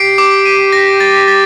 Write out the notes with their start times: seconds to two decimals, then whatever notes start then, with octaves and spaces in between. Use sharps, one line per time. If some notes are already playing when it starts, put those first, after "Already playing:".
Already playing: G4 C7 D7
0.18 D6
0.46 D#7
0.73 A#6
1.00 A6
1.28 A6